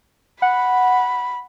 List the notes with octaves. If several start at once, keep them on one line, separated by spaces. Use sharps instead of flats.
F#5 B5